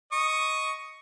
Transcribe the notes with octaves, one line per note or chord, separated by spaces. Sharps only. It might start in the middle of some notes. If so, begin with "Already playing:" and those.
D#5 C#6 D#6